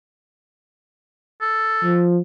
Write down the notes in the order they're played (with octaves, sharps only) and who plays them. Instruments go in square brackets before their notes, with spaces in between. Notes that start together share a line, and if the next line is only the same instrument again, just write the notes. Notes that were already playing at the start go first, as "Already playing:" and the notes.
[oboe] A4
[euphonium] F3